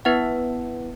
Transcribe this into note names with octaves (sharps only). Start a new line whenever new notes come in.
B3 E4 B4 F#5